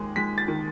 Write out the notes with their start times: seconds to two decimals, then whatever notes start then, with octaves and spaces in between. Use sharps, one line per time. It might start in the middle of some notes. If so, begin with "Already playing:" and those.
Already playing: D#2 G#3
0.16 G#3 B6
0.38 A6
0.48 D#3